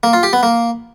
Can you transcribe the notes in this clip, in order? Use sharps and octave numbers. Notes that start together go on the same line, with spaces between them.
A#3
F4
G4
B3
A#3